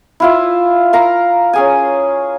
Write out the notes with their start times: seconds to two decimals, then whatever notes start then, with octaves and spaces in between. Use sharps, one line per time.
0.20 E4 F4 E5
0.93 A#4 F5 A#5
1.53 C#4 G#4 G#5